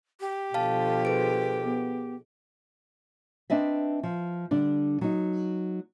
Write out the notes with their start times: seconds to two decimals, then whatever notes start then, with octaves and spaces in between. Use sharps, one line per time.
0.20 G4
0.54 B2 D3 F3 F5 A5
1.05 G#4 B4 D7
1.64 B3
3.50 C4 D4 B4 D#5 E5
4.03 F3
4.51 D3 G3 D4
5.01 F#3 D#4